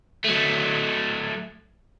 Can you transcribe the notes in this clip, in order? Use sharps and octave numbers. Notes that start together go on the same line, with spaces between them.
F#3 A3